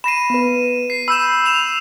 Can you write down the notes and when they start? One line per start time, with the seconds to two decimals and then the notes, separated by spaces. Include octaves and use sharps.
0.04 B5 A#6 C7 D#7 E7
0.30 B3 B4
0.90 C7
1.08 B5 E6 G6 C7 E7
1.46 E7 F7